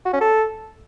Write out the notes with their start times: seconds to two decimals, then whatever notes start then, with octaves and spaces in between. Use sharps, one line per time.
0.06 F#4
0.13 C#4
0.21 A4